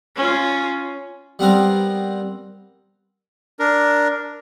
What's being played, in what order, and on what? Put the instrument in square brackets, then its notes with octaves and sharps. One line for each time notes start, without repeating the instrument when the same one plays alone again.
[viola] C#4 F4
[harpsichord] G3 B3 C4 A#4
[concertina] D4 A#4